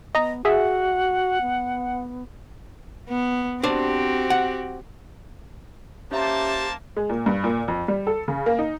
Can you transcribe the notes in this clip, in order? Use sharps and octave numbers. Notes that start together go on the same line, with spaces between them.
B3 D#5 A#5
F#4 G#4 E5 F#5
B3
B3
C4 D4 F#4 G4 C5
F#5
A#3 C#4 G4 C5 E5 A5 A#5
G#3
A#2
G2
A#2
F2
G3
A4
C#3
A#3
D#4